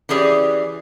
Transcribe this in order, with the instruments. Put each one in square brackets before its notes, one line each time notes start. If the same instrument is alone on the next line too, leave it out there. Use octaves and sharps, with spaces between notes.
[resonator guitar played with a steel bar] E3 C#4 G4 G#4 D5